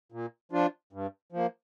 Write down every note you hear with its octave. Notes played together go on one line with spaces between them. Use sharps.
A#2
F3 D4 F4
G2
F3 A#3